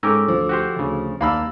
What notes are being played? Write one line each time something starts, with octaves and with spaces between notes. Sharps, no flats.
G#2 C#4 A4 A#4 G5 D6 E6
D2 F3
F#4 G4 C5
D2 C#3
D#2 A#3 D4 F5 B5 E6